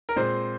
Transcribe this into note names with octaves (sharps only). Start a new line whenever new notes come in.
A#4
A#2 G#3 C4 C5